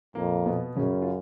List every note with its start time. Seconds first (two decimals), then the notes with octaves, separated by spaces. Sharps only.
0.15 F2 A#2 A#3
0.46 B2 B3
0.76 F#2 C#3 C#4
1.02 F4